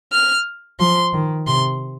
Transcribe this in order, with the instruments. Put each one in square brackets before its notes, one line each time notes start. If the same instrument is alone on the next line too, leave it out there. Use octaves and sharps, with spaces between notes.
[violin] F6
[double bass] F3 [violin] C6
[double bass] D#3
[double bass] C3 [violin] C6